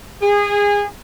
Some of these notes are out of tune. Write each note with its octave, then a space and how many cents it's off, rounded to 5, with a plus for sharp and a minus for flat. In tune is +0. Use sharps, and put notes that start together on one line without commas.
G#4 -25